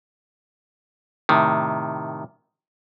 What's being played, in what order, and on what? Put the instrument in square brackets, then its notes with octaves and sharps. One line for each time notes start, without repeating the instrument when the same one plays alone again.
[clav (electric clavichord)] A2 C3 D#3